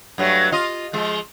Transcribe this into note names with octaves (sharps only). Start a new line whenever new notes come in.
G2 F#3 A3
F4 D#5
F3 G#3